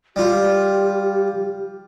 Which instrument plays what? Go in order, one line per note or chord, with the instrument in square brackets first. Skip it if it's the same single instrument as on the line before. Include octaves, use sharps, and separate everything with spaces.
[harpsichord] G3 F4 [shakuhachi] G4